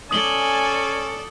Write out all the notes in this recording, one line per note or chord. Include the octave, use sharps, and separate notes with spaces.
C#4 A4 D5 G#5 D#6 F#7 G7